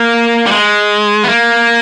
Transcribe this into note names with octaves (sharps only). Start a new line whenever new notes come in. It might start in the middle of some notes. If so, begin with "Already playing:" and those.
Already playing: A#3
G3
G#3
B3
A#3